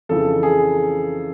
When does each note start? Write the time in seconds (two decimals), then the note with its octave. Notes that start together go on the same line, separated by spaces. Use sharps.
0.09 F2 C#3 E3 A4
0.43 G#4